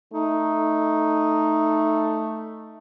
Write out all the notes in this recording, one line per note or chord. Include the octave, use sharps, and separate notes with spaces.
A3 D#4